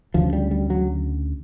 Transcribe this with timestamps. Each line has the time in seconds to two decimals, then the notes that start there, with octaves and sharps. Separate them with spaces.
0.14 D2 C#3 F3
0.33 G3
0.51 G3
0.70 F#3